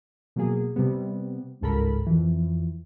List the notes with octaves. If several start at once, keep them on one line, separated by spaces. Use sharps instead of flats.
B2 F#3 A#3 G#4
C3 G3 B3
G1 C#2 G#2 A4 A#4 B5
F2 E3